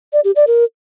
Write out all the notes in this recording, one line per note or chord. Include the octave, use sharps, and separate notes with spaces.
D5
G4
D5
A#4